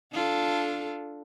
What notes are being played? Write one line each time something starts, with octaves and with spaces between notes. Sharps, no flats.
D4 F4 A4